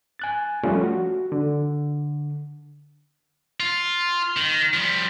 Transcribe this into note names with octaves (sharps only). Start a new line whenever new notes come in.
G#5 F#6 A6
F3 G3 A3 C#4 F4
F#4
D3
F4
D#3
F3 G3